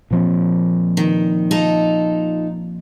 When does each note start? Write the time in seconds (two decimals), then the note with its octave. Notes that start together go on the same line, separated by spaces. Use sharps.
0.11 A#2 F3 C4
0.97 D#3
1.51 D#4 F4 A4